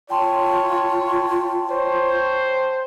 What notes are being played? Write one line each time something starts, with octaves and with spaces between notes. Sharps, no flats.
F4 C#5 G5 A5 C6
C5 C#5